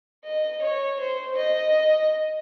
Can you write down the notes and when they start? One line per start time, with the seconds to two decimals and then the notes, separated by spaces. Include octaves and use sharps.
0.25 D#5
0.62 C#5
0.99 C5
1.38 D#5